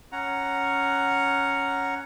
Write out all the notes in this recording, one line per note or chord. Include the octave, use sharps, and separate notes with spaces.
C#4 F#5 A#5